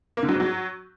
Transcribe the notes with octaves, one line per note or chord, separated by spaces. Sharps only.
A#3
D3
F#3
G#2
F#3